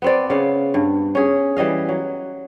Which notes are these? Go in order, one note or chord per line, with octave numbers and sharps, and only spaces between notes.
B3 C4 D5
C#3 B3 F5
G2
C#4 G#4
E3 G3 D#5 F5
F#3